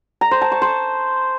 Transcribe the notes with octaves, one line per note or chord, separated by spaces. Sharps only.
A#5
C5
A5
C#6
C5